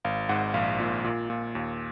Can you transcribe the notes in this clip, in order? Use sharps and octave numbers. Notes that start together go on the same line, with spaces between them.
G#1 F5
G#2 F#5
A#1 F5
A#2
A#2
A#2
D#2